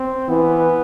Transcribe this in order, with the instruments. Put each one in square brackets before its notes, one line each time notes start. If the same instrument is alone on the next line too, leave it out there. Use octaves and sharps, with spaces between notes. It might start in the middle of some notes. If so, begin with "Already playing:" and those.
Already playing: [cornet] C4
[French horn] E3 [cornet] B3